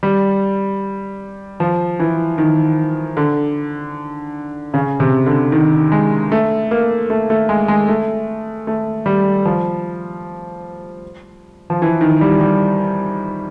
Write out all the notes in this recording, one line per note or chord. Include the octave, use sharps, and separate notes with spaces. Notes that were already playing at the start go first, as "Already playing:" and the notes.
G3
F3
E3
D#3
D3
C#3
C3
D3
D#3
G#3
A3
A#3
A3
A3
G#3
G#3
A3
A3
G3
F3
F3
E3
D#3
G3
G3